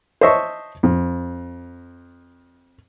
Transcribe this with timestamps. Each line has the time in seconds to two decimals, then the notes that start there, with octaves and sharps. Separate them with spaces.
0.21 C5 C#5 D#5 E5 A5 C#6
0.83 F2